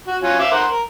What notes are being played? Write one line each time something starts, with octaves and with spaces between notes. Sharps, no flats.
F#4
F#3 C#4 F4
E5 F5 D6
A#4 C5 F#5
A#4